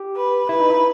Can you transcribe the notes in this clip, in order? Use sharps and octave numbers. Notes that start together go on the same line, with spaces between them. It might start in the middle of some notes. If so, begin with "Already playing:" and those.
Already playing: G4
B4
E4 B4
D#4
E4